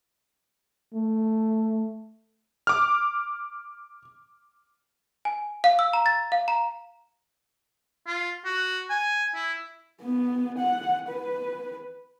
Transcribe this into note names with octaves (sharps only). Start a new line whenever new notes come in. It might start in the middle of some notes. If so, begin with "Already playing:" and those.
A3
D6 F6
G#5
F5
E6
A#5
A6
F5
A#5
F4
F#4
G#5
E4
B3
F#5
B4